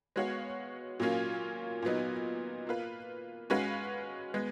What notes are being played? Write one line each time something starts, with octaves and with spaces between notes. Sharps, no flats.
G#3 B3 F#4 C#5 F5
A#2 F#3 A#3 C#4 F4
A#2 F#3 B3 D#4
A#3 F4 B4
G#3 C#4 F#4 B4 F5
G#3 B3